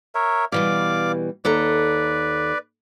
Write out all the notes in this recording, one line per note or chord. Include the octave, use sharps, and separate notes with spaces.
A#4 C#5 E5
B2 E3 G3 D5 F5 D6
D#2 A4 B4 D5 A#5